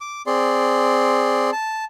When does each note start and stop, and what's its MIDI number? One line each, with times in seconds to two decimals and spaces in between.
0.01 0.22 86
0.27 1.50 60
0.27 1.50 68
0.27 1.50 74
0.27 1.50 84
1.52 1.85 81